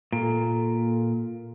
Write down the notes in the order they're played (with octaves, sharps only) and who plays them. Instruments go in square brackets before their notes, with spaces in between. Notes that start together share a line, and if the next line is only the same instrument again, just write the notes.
[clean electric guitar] A#2 [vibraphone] A#3 A4